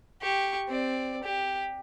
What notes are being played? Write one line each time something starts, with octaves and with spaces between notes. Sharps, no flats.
G4 C#6
C4 D5
G4